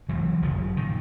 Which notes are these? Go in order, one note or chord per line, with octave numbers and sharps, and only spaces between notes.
E1 D#2 C#3 E3 F#3
G1 F#2 C#3 F3
A#2 D#3